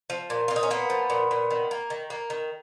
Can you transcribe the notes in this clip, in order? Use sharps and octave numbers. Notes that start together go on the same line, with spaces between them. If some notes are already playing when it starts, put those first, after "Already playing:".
F3
A#2
F4
A#2
D#4
C#4
A#3 B3
F3
A#2
A#2
D#3
A#3
D#3
A#3
D#3